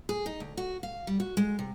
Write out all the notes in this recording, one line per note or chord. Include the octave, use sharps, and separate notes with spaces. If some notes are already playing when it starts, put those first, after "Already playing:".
G#4
D#4
D2
F#4
F5
G3
F#4
G#3
C3